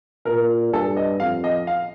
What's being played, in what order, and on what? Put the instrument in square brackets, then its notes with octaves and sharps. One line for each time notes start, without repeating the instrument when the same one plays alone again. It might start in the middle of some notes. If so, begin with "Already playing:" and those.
[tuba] A#2 [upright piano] A#4
[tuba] G2 [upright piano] A4
[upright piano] D#5
[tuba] F2 [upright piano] F5
[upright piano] D#5
F5